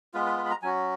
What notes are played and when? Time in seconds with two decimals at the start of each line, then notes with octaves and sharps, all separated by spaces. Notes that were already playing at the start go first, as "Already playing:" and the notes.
0.14 G#3 B3 F4 B4
0.26 B4
0.38 B4
0.45 B5
0.50 A#5
0.62 F#3 C#4 F#4 G#5